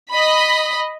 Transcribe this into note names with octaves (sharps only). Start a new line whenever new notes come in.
D#5 B5